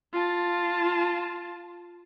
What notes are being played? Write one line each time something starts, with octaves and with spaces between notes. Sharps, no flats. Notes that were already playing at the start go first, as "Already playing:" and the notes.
F4 A5